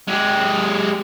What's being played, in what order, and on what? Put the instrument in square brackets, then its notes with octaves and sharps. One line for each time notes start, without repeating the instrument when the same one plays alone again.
[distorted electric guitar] G#3 G4